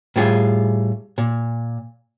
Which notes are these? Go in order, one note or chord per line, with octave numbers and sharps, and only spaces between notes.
A2 G3 F4 G#4
A#2